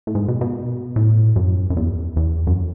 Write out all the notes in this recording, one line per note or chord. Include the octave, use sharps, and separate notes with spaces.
A2
G#2
B2
B2
A2
F#2
F#2
E2
E2
F#2